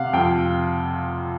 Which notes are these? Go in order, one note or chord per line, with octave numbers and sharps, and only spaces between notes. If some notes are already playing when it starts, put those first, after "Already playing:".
Already playing: C3 F5 F#5
F2 G5